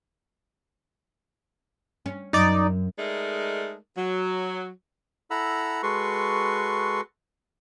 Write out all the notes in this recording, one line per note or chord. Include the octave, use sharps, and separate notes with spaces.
C#4
F#2 D#4 D5
G#3 A3 D#4 A#4 D5
F#3
E4 A4 F#5 A#5 B5 E6
G#3 F#4 A4 B4 C6 C#6